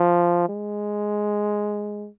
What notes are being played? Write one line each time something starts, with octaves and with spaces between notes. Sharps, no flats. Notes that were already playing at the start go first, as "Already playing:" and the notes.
Already playing: F3
G#3